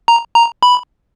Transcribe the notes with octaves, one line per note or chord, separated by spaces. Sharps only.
A#5
A#5
B5